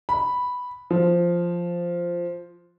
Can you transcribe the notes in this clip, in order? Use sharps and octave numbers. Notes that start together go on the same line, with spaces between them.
B5
F3